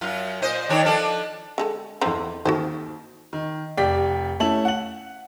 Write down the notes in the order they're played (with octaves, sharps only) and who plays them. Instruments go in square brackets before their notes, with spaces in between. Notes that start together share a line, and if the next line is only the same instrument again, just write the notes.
[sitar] F#2 F4
A#2 C5 D#5
D#3 D4 C#5
F3 D4 A4
[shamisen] D3 G#3 A4
[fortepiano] E2 A4 C5 [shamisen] D3 C4 D#4
[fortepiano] D#2 D#3 [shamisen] F#4 A4 C5
[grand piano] D#3
F1 G4 D5 G5 B6
A3 C#4 E4 A5 F#7
F#5 F#7